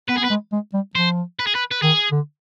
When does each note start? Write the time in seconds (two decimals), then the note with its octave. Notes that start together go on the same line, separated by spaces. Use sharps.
0.08 B3 B4
0.17 G#4
0.20 B3 B4
0.30 G#3
0.52 G#3
0.74 G3
0.95 F3 C5
1.40 B4
1.47 G#4
1.55 B4
1.71 B4
1.82 D#3 G#4
2.11 D3